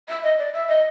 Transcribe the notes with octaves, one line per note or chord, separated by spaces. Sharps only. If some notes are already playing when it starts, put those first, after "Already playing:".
E5
D#5
D5
E5
D#5